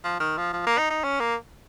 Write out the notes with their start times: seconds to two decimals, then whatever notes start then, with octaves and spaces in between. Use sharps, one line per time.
0.04 F3
0.20 D#3
0.38 F3
0.53 F3
0.67 A#3
0.78 D#4
0.91 D#4
1.04 C#4
1.20 A#3